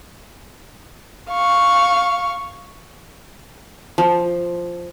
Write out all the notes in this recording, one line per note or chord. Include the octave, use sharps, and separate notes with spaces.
F5 C#6
F3